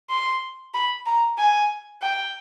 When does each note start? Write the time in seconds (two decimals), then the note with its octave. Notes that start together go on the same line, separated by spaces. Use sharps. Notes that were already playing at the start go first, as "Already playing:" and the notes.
0.10 C6
0.74 B5
1.06 A#5
1.38 G#5
2.02 G5